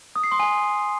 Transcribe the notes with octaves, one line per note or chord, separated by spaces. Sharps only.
D#6
C7
C6
G#5